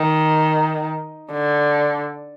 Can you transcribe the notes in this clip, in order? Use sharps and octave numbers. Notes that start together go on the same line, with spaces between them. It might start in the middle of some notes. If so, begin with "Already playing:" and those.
Already playing: D#3
D3